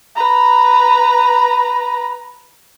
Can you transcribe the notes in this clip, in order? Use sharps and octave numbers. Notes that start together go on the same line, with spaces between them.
B4 A#5